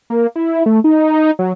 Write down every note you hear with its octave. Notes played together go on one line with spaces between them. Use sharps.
A#3
E4
A3
D#4
F#3